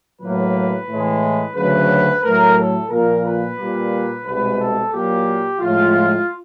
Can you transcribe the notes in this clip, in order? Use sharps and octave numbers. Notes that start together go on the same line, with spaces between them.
A2 F#3 A#3 B4
A2 E3 G#3
D2 C#3 F#3 B4
A2 F#3 A3 A#4
A4
A#2 F3 A#3 A#4
B4
A#2 G3 A#3
C2 B2 G#3 B4
A4
A#2 F#3 A#3 G4
A2 F3 G#3 F4